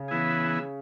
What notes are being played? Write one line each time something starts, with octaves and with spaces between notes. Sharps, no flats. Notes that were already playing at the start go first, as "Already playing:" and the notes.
Already playing: C#3
E3 B3 E4 G#4